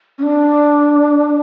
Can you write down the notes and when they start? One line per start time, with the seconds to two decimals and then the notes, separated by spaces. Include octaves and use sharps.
0.18 C#4
0.22 D4